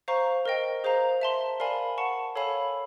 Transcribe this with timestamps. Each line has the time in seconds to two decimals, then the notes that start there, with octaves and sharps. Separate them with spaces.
0.08 C5 F5 A#5 C#6
0.46 A#4 D#5 G5
0.84 G#4 C5 F5 A#5
1.21 E5 A5 C6
1.60 A#4 D5 F5 G#5 B5
1.98 F#5 A5 C#6
2.35 A4 C#5 F5 G#5 B5